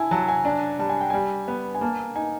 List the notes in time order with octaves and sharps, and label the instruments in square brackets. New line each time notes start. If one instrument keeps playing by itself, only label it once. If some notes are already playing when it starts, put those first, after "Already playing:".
Already playing: [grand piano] E4 [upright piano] G#5 A5
[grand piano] F#3 [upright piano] A5
[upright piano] G#5
[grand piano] D4 [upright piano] A5
[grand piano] G3 [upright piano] A5
[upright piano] G#5
G5
[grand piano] G3 [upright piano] G#5
[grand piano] B3
[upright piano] G#5
[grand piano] A#3 [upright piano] A5
[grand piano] D#4 [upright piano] G#5